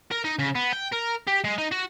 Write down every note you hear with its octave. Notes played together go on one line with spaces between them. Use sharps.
A#4
D#4
C#3
B3
G5
A#4
G4
G#3
D#4
F#4